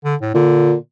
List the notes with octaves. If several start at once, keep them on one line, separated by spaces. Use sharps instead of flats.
D3
A2
A#2 D3